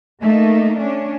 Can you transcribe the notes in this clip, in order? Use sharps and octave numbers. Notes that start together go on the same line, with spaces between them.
A3 A#3 D#4
C#4 D4